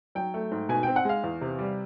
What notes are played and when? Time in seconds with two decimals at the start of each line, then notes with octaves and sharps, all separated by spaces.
0.15 F#3 G5
0.34 A3
0.51 G#2
0.69 B2 G#5
0.83 C4 G5
0.96 F#5
1.05 G#3 F5
1.24 E2
1.41 C3
1.59 G3